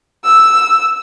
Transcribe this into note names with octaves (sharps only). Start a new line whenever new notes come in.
E6